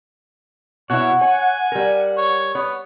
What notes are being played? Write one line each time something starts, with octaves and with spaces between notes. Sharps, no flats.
B2 E4 C#5 F#5
C#5 G#5
G3 A#4
C#5
B3 C#5